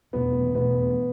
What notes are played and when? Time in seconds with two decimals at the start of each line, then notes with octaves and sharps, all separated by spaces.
0.13 F1 E2 B2 A3 B3
0.54 F1 E2 B2 A3 B3